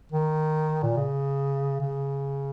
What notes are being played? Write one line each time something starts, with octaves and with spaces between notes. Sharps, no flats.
D#3
A#2
C#3
C#3